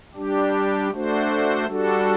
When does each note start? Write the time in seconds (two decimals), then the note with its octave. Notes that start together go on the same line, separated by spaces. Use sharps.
0.15 G3 D4 G4
0.91 A3 D4 F#4 C5
1.66 G3 D4 F#4 A4